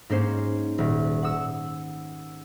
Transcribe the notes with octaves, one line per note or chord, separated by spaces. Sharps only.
G#2 A#3 C#4 C5 C7
D#1
F#5 D#6 E6